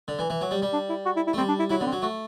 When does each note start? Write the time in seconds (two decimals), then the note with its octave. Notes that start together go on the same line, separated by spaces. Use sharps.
0.08 D3
0.19 E3
0.30 E3
0.41 F#3
0.51 G3
0.62 G3
0.73 D4
0.89 E4
1.06 F#4
1.16 E4
1.27 E4
1.33 A3
1.38 G3 C4
1.48 D4
1.59 E4
1.70 F#3 E4
1.80 D3 B3
1.86 C4
1.92 F#3
2.02 A3 F#4